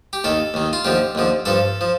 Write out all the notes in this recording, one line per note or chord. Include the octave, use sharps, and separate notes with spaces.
G4
D#2 D#3 A4
D#2 D#3
F4
D#2 D3 F3 G4
D#2 D3 F3
G2 F3 A4
F3